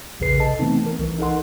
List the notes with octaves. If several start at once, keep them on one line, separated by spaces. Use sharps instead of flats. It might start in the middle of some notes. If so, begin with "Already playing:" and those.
A#1 E2 C#3 G#4 B4 C7
C3 A4 D#5 A5
E3 A3 B3 C4 D#4
A#4
C2 E3
D#4 A4 A#4 F#5 C6